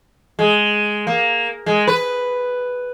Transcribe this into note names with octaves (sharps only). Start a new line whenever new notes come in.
G#3
A#3
G#3
B4